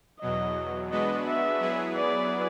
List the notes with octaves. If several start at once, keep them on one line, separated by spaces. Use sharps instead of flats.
E2 B2 F#3 D#5
G#3 B3 D4 F#4 B4 D#5
E5
F#3 B3 E4 G#4 B4
D5